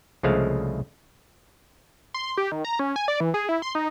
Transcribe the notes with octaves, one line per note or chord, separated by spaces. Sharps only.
C2 C#3 F3 G#3 A3 F5
C6
G4
D#3
A#5
C#4
G#5
D5
E3
G#4
E4
C6
D#4